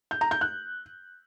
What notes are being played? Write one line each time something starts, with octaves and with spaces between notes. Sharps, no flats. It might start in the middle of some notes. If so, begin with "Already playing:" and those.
G6
A#5
G6
F#6